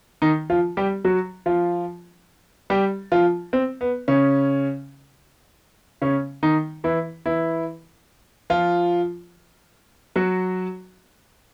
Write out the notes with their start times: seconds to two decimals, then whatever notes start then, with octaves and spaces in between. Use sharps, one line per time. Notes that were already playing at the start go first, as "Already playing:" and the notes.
0.22 D#3 D#4
0.50 F3 F4
0.77 G3 G4
1.05 F#3 F#4
1.46 F3 F4
2.70 G3 G4
3.12 F3 F4
3.53 C4
3.81 B3
4.08 C#3 C#4
6.02 C#3 C#4
6.43 D#3 D#4
6.84 E3 E4
7.26 E3 E4
8.50 F3 F4
10.16 F#3 F#4